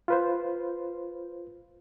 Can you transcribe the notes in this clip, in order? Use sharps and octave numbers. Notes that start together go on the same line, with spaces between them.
F4 B4 C5